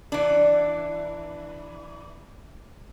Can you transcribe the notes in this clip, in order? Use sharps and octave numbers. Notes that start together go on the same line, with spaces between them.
E3 D4